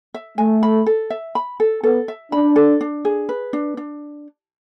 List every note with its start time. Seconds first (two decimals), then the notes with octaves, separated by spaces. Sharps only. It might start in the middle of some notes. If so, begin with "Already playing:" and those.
0.14 E5
0.38 A3 G#5
0.63 B5
0.86 A4
1.10 E5
1.35 B5
1.60 A4
1.84 B3 A4
2.08 E5
2.32 D4 B5
2.56 A4
2.81 D4
3.05 G#4
3.29 B4
3.53 D4
3.77 D4